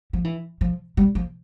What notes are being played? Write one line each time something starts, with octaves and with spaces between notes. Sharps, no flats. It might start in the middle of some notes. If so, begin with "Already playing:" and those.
F3
E3
F3
G3
F3